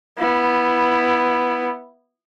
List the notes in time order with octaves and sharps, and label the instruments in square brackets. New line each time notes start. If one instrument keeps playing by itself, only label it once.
[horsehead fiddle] B3 E4